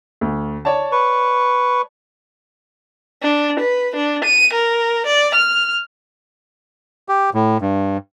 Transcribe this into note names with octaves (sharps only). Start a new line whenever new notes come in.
D2
C#5 D5 A5
B4 C#6
D4
B4
D4
D#7
A#4
D5
F6
G4
A2
G2